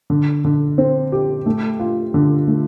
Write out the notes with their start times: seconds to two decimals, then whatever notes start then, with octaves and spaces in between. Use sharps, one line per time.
0.10 D3
0.45 D3
0.78 C4
1.12 G4
1.46 A3
1.79 F4
2.14 D3
2.48 A3